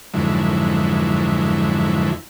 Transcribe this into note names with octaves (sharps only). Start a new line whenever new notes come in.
F2 G#2 D3 F#3 E4